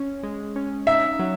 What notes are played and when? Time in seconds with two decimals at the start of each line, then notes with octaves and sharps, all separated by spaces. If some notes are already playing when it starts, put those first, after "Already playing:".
Already playing: C#4
0.23 G#3
0.56 C#4
0.87 D#4 E5
1.19 F#3